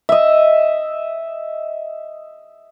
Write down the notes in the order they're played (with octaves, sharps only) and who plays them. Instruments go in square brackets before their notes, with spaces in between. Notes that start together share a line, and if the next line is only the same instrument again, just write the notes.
[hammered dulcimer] D#5 E5